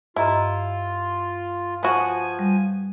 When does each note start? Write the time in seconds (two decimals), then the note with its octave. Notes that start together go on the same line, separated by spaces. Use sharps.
0.16 G2 E4 F4 D#5 A#5
1.83 F3 B3 F#4 G#5
2.39 G3